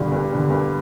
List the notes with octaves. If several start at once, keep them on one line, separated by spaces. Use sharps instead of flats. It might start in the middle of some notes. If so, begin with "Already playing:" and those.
Already playing: G2 D3 G3
G2
D3 G3
G2